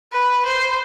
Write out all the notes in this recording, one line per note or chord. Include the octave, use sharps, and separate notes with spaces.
B4
C5